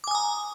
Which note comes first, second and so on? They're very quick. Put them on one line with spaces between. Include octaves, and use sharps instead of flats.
D6 G#5 D#6 A#5